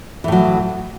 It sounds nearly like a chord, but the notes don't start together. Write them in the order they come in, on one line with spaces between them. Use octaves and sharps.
E3 A2 F#3